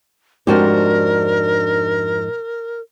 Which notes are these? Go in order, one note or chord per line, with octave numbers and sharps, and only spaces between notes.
F2 G#2 D4 F#4 G4 A#4